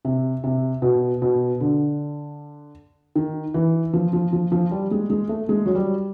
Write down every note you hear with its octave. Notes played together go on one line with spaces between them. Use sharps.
C3
C3
B2
B2
D3
D#3
E3
F3
F3
F3
F3
G3
G#3
G#3
A3
G#3
F#3
G3